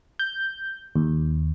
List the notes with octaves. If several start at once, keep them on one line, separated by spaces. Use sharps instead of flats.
G6
D#2